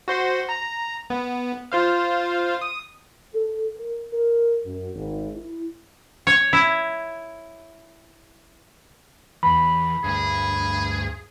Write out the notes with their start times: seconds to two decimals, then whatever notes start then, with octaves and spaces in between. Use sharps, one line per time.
0.08 F#4 C5 C6
0.49 A#5
1.10 B3
1.72 F4 C5 F5
2.61 D#6
3.34 A4
3.77 A#4
4.12 A#4
4.64 F#2
4.95 G#1
5.35 E4
6.27 C#5
6.53 E4
9.43 E2 E3 B5
10.04 D2 G2 G#4